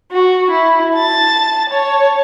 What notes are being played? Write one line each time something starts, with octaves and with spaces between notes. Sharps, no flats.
F#4
E4
A5 A6
C#5 A5